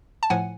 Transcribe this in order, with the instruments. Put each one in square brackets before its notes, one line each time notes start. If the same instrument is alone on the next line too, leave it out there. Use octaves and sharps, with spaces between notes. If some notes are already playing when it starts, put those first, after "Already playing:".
[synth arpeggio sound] A5
A2 F3 F#5 G#5